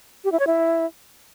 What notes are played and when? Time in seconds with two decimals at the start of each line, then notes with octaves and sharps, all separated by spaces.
0.24 G4
0.32 E4
0.40 C#5
0.47 E4